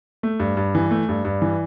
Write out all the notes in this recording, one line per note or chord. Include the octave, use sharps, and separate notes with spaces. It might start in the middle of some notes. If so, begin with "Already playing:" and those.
A3
G2
G2
E3
A3
G2
G2
E3